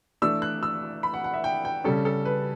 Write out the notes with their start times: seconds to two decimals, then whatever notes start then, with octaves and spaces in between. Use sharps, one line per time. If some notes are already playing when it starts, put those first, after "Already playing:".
0.22 E3 A3 D4 E6
0.42 F#6
0.63 E6
1.03 B5
1.14 F#5
1.24 F#5
1.34 E5
1.44 G5
1.65 G5
1.84 C#3 G3 C#4 A4
2.05 A4
2.25 B4